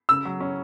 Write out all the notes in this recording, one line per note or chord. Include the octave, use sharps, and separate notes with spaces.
C#3 E6
F#3
C#4